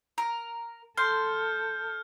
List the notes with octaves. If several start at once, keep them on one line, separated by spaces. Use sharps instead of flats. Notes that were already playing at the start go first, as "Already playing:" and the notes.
A#4
A4 C6 F6 G6